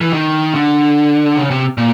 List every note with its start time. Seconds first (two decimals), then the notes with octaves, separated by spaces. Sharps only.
0.01 E3
0.13 D#3
0.55 D3
1.37 C#3
1.50 C3
1.78 A#2